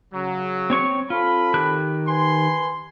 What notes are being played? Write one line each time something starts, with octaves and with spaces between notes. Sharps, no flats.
C#3 F#3
C4 C#5 C#6
C4 F4 A4 B5
D#3 G4 F#6
B4 G#5 C6